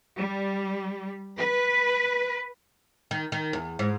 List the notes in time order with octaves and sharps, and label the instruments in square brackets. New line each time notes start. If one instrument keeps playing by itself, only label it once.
[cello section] G3
B4
[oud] D#3
D#3
E2
G#2